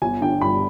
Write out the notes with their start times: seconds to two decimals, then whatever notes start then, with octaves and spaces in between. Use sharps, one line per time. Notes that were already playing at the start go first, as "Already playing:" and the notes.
0.02 G1 G#5
0.21 D3 G5
0.41 G2 B5